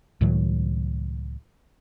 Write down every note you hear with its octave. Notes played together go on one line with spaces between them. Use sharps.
C#2 A2 D#3 F#3